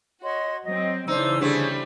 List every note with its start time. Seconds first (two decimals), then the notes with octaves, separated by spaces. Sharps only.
0.22 F#4 C#5 D#5 C6
0.65 F#3 C4 D#5
1.08 C#3 E3 D4 D#4 C5 E6
1.41 D3 G3 A3 C4 C#4 G#4